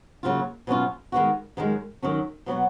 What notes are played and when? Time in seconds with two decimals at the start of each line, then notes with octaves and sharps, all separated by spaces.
0.23 C#3 F#3 A#3 F4
0.67 B2 F#3 C#4 F4
1.12 D#3 G#3 B3 F#4
1.57 F#2 D#3 G#3
2.02 D#3 F#3 C#4
2.46 B2 F#3 B3 F#4